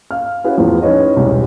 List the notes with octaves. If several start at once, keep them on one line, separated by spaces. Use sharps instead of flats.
F5 F6
C#4 E4 F#4 G#4 B4 F5
E2 A2 F3
C#4 D#4 B4 C#5 D#5
E1 C2